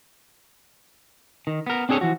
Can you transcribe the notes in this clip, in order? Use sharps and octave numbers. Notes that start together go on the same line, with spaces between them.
D#3
B3 A#4
C4 D4 G#4 A4 C#5
E3 F3 F#4